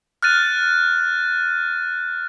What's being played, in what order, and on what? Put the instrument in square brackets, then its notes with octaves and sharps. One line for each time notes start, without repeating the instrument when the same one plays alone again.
[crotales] F6 F#6 A6 D#7